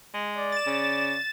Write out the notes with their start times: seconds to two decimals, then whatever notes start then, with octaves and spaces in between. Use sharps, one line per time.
0.14 G#3
0.37 D5
0.52 A6 E7
0.66 C#3